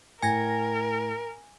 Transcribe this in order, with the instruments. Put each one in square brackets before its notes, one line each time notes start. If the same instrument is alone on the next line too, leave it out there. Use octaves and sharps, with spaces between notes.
[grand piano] A2 [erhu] A#4 [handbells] G#5 G#6 A#6